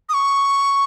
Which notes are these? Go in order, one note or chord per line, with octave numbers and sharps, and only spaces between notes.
D#6
C#6